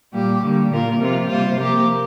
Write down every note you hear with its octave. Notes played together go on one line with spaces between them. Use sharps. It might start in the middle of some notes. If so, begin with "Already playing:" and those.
A#2 G3 A#3 G4
D3 G3 A#3
A#2 A#3 F4 A#4
C3 F3 C4 F4
C3 G3 A#3 F4 C5
F3 A#3 G4 A#4